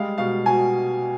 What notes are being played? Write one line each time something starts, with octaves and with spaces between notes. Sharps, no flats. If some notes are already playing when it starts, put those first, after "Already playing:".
Already playing: G3 G#3 F5
B2 F5
B2 G#5